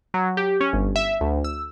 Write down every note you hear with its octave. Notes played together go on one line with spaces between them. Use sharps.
F#3
G4
C#4
G1
E5
D2
E6